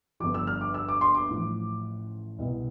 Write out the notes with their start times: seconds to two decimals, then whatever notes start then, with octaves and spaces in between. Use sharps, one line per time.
0.20 G1 G2 F3 D6
0.34 E6
0.47 F6
0.61 D6
0.74 E6
0.89 D6
1.01 C6
1.14 D6
1.29 A1 A2 F3
2.38 C2 B2